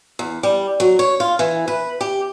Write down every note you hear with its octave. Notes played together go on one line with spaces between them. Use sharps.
E2
G3
F#3
C#5
F4
E3
B4
G4